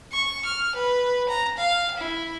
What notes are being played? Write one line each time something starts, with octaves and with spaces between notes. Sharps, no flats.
C#6
F6
B4
A#5
F5
E4